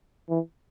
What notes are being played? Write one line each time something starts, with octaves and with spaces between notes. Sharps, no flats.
E3